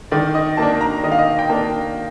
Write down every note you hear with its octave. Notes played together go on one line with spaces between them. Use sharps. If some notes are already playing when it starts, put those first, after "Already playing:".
D#3 D5
D#5
A#3 D4 A5
A#5
D#3 D#5
F5
D#5
G5
A#3 D4 A5